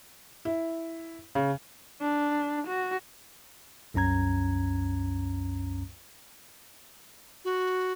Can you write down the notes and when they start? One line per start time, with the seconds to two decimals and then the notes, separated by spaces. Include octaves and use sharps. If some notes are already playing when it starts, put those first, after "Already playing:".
0.45 E4
1.35 C#3
2.01 D4
2.68 F#4
3.94 C2 F#2 C#4 A#5 G#6
7.45 F#4